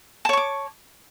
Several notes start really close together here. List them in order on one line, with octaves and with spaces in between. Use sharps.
A5 C#5 C#6 D6